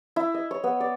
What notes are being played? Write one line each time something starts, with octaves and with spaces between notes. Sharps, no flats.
E4
D#5
C#5
B3
D5